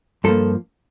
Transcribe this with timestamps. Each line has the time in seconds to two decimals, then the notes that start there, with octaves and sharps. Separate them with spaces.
0.24 G2 F3 A#3 A4